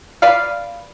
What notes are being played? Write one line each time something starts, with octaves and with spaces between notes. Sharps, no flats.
B4 D5 F5